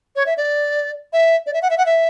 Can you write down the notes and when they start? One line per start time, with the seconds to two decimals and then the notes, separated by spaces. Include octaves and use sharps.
0.16 C#5
0.26 E5
0.37 D5
1.13 E5
1.46 D5
1.54 E5
1.62 F#5
1.70 E5
1.78 F#5
1.86 E5